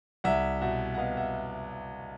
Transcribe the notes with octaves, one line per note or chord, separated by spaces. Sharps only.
C2 E5 F#5
B2 E5 F#5
F#5
B3 D#5 F5
E5 F#5